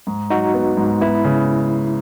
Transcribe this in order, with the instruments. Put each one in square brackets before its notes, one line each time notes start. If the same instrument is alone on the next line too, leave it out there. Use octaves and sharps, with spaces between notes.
[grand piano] G#2
[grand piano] F#3 [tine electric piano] D#4 F#4
[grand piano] B3
G#2
[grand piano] B3 [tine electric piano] E4
[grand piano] C#3